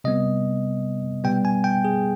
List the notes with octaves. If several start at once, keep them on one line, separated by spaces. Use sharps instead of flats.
C3 G3 B3 D#5
B2 G3 B3 G5
G#5
G5
G#4